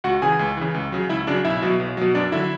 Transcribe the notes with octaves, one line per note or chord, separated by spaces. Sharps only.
C#2 F#4 F#5
C#3 E3 G#4 G#5
C#2
C#3 E3
C#2
C#3 F#3
C#2 E4 E5
C#3 F#3 D4 D5
B1 E4 E5
B2 F#3
B1
B2 F#3
F#2 D4 D5
D3 F#3 E4 E5